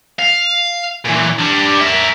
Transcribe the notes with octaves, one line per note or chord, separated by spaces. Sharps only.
F5
A#2 E3
G3 D4
A#4 E5